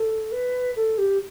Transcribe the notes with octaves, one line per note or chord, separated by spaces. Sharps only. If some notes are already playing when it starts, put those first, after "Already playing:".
Already playing: A4
B4
A4
G4